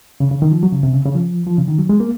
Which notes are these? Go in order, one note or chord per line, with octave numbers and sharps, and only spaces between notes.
C#3
C#3
D#3
F3
F#3
C#3
C3
C#3
C#3
F3
F3
C#3
D#3
F#3
G#3
A#3